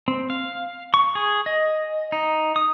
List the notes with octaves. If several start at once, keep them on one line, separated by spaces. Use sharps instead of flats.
C4
F5
C#6
G#4
D#5
D#4
D#6